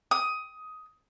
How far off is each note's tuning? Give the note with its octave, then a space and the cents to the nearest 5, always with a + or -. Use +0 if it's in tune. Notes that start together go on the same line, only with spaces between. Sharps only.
D#6 +15